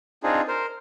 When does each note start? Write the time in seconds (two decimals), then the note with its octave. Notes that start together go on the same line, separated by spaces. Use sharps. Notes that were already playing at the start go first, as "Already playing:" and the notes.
0.23 C4 D4 D#4 F4 G#4
0.48 A#4 C5